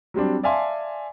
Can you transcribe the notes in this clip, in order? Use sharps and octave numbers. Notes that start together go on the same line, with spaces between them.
F#3 G3 C4 D4
D5 E5 F5 G#5 A5 C6